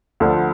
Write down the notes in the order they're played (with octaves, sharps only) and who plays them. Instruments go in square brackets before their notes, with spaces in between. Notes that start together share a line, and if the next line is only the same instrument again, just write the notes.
[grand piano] D2 D3 F3